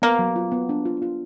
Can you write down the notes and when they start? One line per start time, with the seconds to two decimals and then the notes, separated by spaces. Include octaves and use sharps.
0.02 A#3 B3
0.19 F#3
0.36 F4
0.52 B3
0.69 D4
0.85 F4
1.02 F4